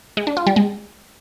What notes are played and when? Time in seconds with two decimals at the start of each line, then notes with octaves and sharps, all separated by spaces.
0.17 G#3
0.27 D4
0.37 F4
0.46 G3
0.56 G#3